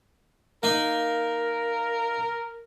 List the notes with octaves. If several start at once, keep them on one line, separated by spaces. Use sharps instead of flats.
A#3 D#4 A#4